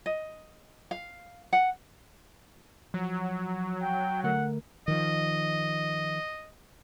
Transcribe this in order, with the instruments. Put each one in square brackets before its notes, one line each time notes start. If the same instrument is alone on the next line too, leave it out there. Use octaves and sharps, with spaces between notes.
[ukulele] D#5
F5
F#5
[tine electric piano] F3 [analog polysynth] F#3
[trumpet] G5
[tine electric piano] D3 A3 A#4 [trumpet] F#5
[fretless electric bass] D#3 F3 [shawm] D#5